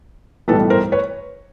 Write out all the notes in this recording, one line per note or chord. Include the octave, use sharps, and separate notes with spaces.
B1 A2 E3 G3 A4 B4
A#4 C5
B4 C#5